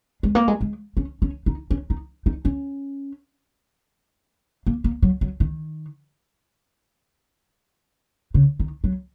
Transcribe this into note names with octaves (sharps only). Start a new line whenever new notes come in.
G#3
A#3
G#3
G#3
C#4
C#4
D#4
C#4
D#4
D#4
C#4
A#3
A#3
F#3
F#3
D#3
C#3
D#3
F#3